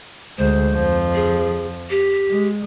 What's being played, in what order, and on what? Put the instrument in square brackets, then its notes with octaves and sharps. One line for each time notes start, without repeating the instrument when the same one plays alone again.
[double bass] D2 G#3 [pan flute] C5
[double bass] F2 F3
[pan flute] G#4
G4
[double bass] G#3